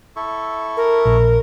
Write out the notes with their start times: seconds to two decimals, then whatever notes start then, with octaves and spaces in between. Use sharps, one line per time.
0.16 E4 A4 C#6
0.77 A#4
1.05 A#1